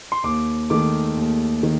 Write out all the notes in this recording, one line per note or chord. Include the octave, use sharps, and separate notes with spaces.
C6
D#2 D6
D#3 A3 D6
D#2
D#3